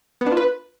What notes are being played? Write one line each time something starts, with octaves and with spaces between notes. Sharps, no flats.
B3
D4
F4
B4